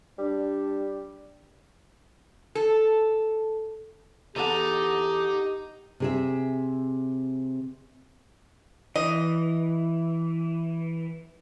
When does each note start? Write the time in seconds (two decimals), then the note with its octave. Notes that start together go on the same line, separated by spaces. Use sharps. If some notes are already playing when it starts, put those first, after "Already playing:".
0.18 G3 D4
2.55 A4
4.36 E2 D#4 G4 A4 F#5 D6
6.00 C3 G#4 E5
8.96 E3 D#5